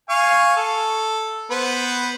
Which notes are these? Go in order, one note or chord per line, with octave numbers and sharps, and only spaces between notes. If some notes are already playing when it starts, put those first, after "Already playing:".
F5 G#5 C#6
A4
B3 B4 C5